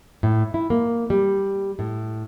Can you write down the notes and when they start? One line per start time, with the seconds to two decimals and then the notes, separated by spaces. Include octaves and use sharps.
0.23 A2
0.54 E4
0.70 A#3
1.10 G3
1.79 A2